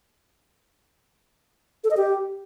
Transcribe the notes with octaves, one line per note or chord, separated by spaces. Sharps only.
A4
D#5
G4